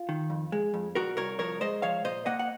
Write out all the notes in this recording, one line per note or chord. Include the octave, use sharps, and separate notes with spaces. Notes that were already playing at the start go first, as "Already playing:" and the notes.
Already playing: F4
D#3
F2
G#3
F2
A#2 F#4 A#4
C2 A#4 C#5
F3 A#4 C#5
G#3 C5 D#5
F3 C#5 F5
A#2 C5 D#5
A#3 D#5 F#5
F#5